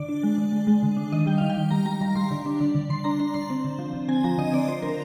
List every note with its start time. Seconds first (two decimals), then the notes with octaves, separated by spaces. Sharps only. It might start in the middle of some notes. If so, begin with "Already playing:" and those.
Already playing: D3 D5
0.09 D4
0.23 G#3
0.38 D3
0.52 G#3
0.67 G#3
0.83 D3
0.97 D4
1.12 D#3 D#5
1.26 G3 G5
1.38 D#3 F5
1.50 G5
1.57 D#3
1.71 G3 A#5
1.85 G3 A#5
2.01 D#3 A#5
2.16 G3 C6
2.31 D3
2.46 D4
2.60 D3
2.75 D3
2.89 D3 C6
3.04 D4 A#5
3.20 D4 C6
3.34 D3 C6
3.50 C4
3.65 D3
3.79 F3
3.93 D3
4.08 C4 G#5
4.24 F3 A#5
4.38 D3 D#5
4.53 C4 D5
4.68 F3 C5
4.82 D3 A#4